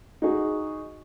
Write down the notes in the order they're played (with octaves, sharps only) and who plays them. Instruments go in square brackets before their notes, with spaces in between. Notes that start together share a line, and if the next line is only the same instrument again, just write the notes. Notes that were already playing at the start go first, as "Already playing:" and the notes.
[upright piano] D#4 F#4 G#4